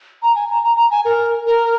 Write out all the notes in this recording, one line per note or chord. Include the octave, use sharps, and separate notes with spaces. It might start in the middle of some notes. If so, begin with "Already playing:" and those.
A#5
G#5
A#5
A#5
A#5
G#5
A#4
A#4